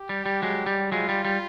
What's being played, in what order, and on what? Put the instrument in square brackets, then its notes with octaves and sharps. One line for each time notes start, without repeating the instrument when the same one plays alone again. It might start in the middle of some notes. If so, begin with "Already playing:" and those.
Already playing: [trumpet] G4
[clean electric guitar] G3
G3
F#3 G#3
G3
[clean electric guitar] F#3 G#3 [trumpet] F4
[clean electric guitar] G3
G3